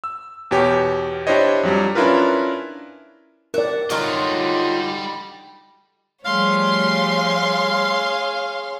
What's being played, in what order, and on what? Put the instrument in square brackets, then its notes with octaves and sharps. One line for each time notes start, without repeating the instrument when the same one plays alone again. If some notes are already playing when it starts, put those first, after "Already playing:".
[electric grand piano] E6
E2 B2 G4 C#5
D4 E4 G4 C5 C#5 D#5
F2 F#3 G3
C#4 D4 E4 F4 A#4 B4
[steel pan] A#4 D5 [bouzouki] E5 F#5
[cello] D3 D#4 [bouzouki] F#3 F4 F#4 [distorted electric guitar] G3 D#5
[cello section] F3 G3 A3 [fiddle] G#4 C#5 [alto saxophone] F5 [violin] C6